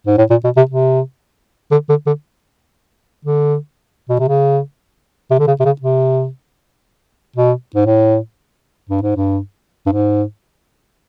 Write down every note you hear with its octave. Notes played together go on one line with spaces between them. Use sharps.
G#2
A2
A#2
B2
C3
C3
D3
D3
D3
D3
B2
C3
C#3
C3
D3
C#3
C3
C#3
C3
B2
G#2
A2
G2
G#2
G2
G2
G#2